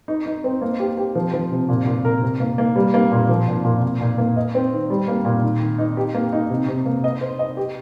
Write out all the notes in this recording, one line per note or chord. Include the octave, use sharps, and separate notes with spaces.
D#4
D#4
C4
A#3
G4
G4
F3
F3
C3
A#2
A#2
A#4
C3
A#3
A#3
G3
A#3
A#2
F3
A#2
A#2
A#2
A#2
A#3
D#5
C4
D#3
G3
A#3
A#2
D#3
D#3
D#4
G4
A#3
D#4
C3
C3
A#3
D#5
C5
D#5
G4